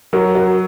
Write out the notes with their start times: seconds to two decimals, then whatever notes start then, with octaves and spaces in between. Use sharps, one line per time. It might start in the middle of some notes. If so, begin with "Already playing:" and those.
0.13 F#3 F#4 A#4
0.35 F#4 A#4